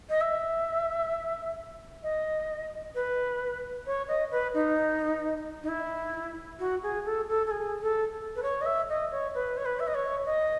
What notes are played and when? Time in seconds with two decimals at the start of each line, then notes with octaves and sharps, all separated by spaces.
0.09 D#5
0.20 E5
2.03 D#5
2.94 B4
3.86 C#5
4.08 D#5
4.31 B4
4.54 D#4
5.63 D#4
5.68 E4
6.59 F#4
6.82 G#4
7.05 A4
7.28 A4
7.46 A4
7.50 G#4
7.82 A4
8.35 B4
8.42 C#5
8.61 D#5
8.65 E5
8.89 D#5
9.11 C#5
9.34 B4
9.57 C#5
9.65 B4
9.79 E5
9.87 D#5
9.94 C#5
10.25 D#5